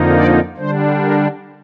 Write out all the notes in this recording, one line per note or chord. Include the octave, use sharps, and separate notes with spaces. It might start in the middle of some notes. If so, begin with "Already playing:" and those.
Already playing: F2 D3 F3 A#3 D#4
D5
D3 G3 D4 C5
A#4